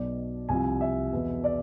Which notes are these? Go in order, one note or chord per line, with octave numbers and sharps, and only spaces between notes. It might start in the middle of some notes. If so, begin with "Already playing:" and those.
Already playing: B1 B2 D5
C2 C3 F3 G#5
E5
E2 B2
D5